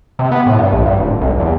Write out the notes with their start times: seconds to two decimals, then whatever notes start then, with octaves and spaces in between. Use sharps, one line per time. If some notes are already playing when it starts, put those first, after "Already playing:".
0.19 C3
0.31 B3
0.47 A2
0.59 G2
0.72 A#1
0.86 G2
0.99 D1
1.21 C2
1.40 E2